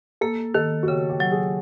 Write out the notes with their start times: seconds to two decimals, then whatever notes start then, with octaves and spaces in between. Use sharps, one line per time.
0.21 A#3 A4
0.54 D#3 A4
0.83 F#4
0.87 C#3 G4
1.09 G4
1.20 F#3
1.32 G#4